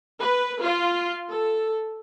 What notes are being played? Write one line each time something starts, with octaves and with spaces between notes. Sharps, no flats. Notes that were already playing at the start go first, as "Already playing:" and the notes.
B4
F4
A4